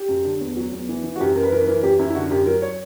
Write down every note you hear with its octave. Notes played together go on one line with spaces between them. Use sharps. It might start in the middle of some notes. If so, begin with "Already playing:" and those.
Already playing: G4
F#2
D3
E2
F#3
E2
E3
E3
F#4
F#2 G4
F#2 A#4
B4
E3 A#4
B4
E3 A#4
F#2 G4
F#2 E4
E4
D3 F#4
F#2 G4
F#3 A#4
C#5